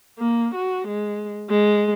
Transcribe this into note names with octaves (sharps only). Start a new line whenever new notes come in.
A#3
F#4
G#3
G#3